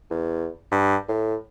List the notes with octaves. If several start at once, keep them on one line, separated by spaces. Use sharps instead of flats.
E2
G2
A2